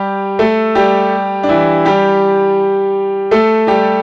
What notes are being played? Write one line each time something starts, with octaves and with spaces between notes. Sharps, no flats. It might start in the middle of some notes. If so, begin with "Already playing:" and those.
Already playing: G3 G4
A3 A4
G3 G4
D4
E3 E4
G3 G4
A3 A4
G3 G4